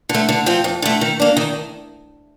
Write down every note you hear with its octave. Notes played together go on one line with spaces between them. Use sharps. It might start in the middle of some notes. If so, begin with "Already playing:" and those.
D3
A3
D3
F3 C4 F4
F2
D3 A3
D#3
A#3 D4
D#3